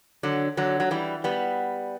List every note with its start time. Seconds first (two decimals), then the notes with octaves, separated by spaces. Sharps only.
0.23 D3 F#3
0.57 D3 F#3
0.80 F#3
0.91 E3 G3
1.24 G3 B3